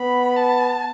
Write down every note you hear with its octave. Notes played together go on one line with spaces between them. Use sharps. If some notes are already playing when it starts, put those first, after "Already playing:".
Already playing: B3 B5
A5